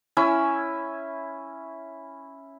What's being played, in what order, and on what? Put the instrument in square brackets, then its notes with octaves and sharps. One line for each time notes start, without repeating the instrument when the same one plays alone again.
[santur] C#4 E4 G#5 E6